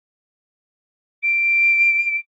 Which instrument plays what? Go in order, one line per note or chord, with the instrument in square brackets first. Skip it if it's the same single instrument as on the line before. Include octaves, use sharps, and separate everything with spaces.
[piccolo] D7